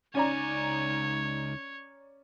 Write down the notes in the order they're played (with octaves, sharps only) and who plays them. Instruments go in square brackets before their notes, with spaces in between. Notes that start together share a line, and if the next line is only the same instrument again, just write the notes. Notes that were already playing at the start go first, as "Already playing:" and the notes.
[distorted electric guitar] C#2 G#5 [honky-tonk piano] C#4 D5 A#5 [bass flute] D#4 [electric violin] C#5